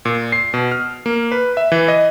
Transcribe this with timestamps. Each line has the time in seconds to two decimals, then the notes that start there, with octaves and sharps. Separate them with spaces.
0.05 A#2
0.32 C7
0.54 B2
0.72 F6
1.06 A#3
1.32 B4
1.57 E5
1.72 E3
1.88 D#5